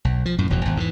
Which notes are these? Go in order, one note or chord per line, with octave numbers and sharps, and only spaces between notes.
B1
F3
F#2 A2
E1 E2 B2
G#1 E2
G#2 C3 E3